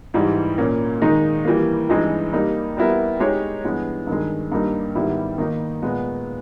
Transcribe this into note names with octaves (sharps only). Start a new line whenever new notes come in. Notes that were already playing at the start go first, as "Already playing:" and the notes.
G#2 E3 G3
A#2 A#3 C#4
D#3 G#3 D#4
E3 G3 A#3
G2 E3 G#3 D#4
G3 A#3 D#4
G3 B3 E4 A#4
G#3 D#4 G4 C#5
G2 E3 G#3 B3
G2 D#3 G#3
G2 G3 A#3 D#4
G#2 D#3 G3 B3 E4
D#3 A#3 D#4
A#2 G#3 B3